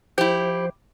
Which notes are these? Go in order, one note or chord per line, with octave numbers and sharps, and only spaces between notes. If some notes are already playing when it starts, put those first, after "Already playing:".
F3 E4 G4 C5